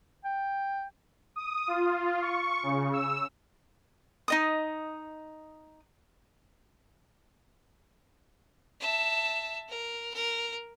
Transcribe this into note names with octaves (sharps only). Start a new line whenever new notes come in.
G5
D#6
F4
C#6
C#3
E6
D#4 D#5 D#6
E5 A5
A#4
A#4